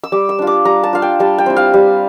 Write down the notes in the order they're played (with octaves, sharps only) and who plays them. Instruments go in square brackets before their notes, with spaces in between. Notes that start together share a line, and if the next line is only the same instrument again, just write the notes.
[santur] E6
G3 D6
E6
D4 F4
D6
G3 A#5
A5
D4 F4 F5
G5
G3 A5
G5
C4 E4
F5
G3